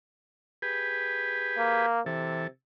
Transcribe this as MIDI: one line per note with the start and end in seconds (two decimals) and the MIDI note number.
0.62 1.86 67
0.62 1.86 68
0.62 1.86 71
1.58 2.01 58
2.06 2.47 48
2.06 2.47 52
2.06 2.47 69